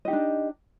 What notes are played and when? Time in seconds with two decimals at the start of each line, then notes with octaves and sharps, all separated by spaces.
0.05 D#5
0.08 G4
0.10 D#4
0.13 D4